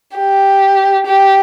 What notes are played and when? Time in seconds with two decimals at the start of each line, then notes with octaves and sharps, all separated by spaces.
0.17 G4
1.07 G4